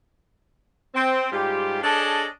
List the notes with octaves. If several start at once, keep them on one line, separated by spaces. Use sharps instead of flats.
C4
G#2 G3 F4 G4
D4 G#4 A4 C#5 D#5 A5